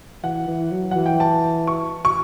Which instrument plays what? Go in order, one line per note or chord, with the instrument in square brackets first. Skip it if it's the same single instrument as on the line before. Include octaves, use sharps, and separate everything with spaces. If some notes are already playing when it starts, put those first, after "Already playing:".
[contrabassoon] E3 [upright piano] F#5
[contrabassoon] E3
F#3
[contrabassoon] E3 [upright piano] F#5
[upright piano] G5
A5
C#6
C#6